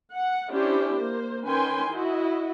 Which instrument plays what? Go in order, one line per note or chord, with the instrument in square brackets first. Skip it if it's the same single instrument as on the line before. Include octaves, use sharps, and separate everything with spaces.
[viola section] F#5
C#4 D4 E4 G4 C5
A#3 C5
D#3 C#4 B4 G5 G#5 C6
E4 F#4 D#5